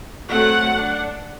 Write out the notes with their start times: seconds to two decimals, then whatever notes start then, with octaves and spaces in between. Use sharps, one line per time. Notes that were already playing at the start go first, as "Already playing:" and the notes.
0.29 F#3 A3 C4 F#5
0.73 D4